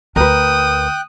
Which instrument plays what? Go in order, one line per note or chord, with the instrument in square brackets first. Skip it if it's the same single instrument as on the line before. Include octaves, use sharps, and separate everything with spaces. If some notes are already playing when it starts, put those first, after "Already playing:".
[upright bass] D2 [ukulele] A#4 B4 [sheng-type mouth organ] G5 F#6 [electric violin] D#6